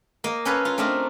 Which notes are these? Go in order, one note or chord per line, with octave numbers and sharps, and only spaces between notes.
A#3 D#5
C#4 A4 B4 C#5 F5
F4 A#5
A3 C4 D4 F4 A#4 D#5